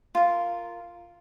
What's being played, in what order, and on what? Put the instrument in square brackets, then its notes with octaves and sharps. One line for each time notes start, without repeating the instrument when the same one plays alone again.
[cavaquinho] F4 A#4